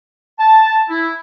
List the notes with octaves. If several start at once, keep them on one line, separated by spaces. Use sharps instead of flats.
A5
E4